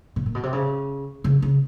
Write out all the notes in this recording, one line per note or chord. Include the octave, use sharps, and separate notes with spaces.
B2
A#2
B2
C3
C#3
C#3
C#3